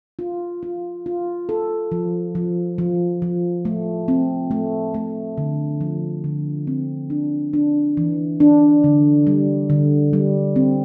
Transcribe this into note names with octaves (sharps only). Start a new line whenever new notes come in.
F4
F4
F4
A4
F3
F3
F3
F3
A3
C4
A3
A3
D3
F3
D3
C4
D4
D4
E3
D4
D3
G3
D3
G3
C4